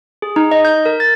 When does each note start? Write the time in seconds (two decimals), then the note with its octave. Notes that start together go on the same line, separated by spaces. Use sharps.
0.22 G#4
0.36 D#4
0.51 D#5
0.65 G6
0.85 A#4
1.00 A6